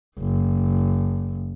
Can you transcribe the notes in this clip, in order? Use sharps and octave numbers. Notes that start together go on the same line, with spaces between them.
F#1